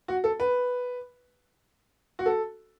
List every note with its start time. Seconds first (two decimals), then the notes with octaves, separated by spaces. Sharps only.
0.08 F#4
0.24 A4
0.40 B4
2.19 F#4
2.26 A4